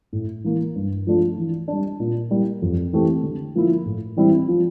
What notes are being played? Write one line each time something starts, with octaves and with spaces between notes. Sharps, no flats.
A2
E3 A#3
G2
F3 A3 D4 F4
E3
G3 D4
A#2
G3 A#3 E4
F2
E3 A3 C4 G4
D3
F3 A#3 E4
A2
E3 G3 C4 E4
F3